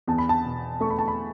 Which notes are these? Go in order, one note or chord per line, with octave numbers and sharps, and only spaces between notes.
E2 A5
B5
A5
B2
A3 C#6
B5
A5
B5